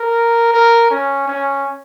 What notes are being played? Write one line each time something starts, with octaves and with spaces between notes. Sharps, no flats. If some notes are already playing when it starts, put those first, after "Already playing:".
Already playing: A#4
A#4
C#4
C#4